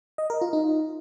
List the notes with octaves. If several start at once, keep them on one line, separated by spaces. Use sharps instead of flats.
D#5
A#4
F4
D#4